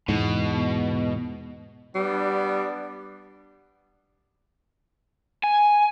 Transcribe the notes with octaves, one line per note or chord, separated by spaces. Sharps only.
E2 G#2 B2
G3 B3 D4
G#5